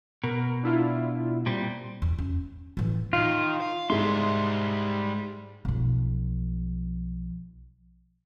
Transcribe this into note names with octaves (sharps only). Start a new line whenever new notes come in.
B2 A#4
D4 E4 F4
A#2 G3 C4
E2
C#4
A2 E3
D#3 F4
F5
G#2 G3 G#3 E5 C6
B1 F3